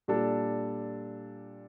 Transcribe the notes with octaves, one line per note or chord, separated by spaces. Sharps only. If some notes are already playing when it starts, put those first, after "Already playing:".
A#2 G3 D4 A4